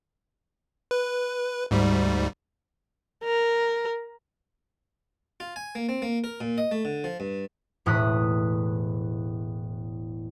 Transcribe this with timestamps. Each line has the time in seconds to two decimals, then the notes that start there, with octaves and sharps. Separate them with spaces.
0.91 B4
1.71 D2 G#2 G3
3.24 A#4
5.40 F4
5.56 G#5
5.75 A#3
5.89 C4
6.02 A#3
6.24 A#4
6.41 A#2
6.58 D#5
6.71 A3
6.85 D3
7.04 F3
7.20 G2
7.86 E1 A2 D#6 F#6 B6